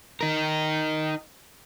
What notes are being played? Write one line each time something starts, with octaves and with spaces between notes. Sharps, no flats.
D#4 A#4